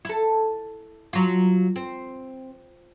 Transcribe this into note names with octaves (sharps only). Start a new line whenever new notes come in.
E4 A4
F#3 F4
C4